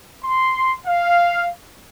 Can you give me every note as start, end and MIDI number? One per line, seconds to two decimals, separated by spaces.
0.22 0.74 84
0.85 1.48 77